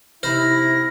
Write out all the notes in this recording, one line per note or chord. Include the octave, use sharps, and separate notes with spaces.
C3 D#4 E4 C5 B5 F6 A#6